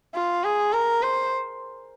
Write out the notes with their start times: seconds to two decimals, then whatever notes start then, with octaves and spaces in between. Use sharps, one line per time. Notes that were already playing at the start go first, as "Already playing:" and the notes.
0.14 F4
0.44 G#4
0.73 A#4
1.02 C5